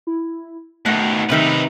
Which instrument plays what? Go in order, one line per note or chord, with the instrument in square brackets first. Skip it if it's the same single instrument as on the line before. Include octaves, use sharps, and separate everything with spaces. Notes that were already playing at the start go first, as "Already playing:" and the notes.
[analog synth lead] E4
[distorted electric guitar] B2 D#3 [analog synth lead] A3 [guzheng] F#5
[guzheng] C3 D#3 E5 [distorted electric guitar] D#4 B4